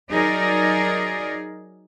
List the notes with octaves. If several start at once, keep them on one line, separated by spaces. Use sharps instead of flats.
F#3 D#4 G#4 A#4 D5